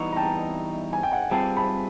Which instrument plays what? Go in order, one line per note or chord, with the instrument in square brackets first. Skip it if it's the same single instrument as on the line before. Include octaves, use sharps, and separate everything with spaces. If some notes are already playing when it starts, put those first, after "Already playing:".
Already playing: [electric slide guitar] E3 G3 B3 D#4 [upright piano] C#6
[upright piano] A#5
G5 A5
G#5
G5
F#5 G#5
[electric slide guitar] G3 C4 F4 G#4 B4 [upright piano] G5 A5
[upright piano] A5 B5